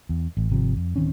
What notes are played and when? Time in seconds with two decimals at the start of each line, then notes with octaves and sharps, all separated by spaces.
0.09 E2
0.37 A1
0.50 G#1 C3 F3
0.77 F2
0.96 D1 D#3 C4 C#4